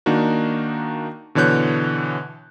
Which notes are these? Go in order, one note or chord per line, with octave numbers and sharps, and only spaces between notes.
D#3 A#3 D4 D#4 F#4
B2 D3 E3 C#5 F#6 G6